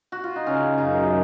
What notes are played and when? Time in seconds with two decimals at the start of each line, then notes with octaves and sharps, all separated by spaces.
0.12 F#4
0.24 F4
0.36 D#4
0.46 C#3 C#4
0.78 F#2 D#4